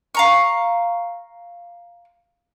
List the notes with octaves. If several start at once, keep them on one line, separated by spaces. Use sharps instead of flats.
F5 A#5 C#6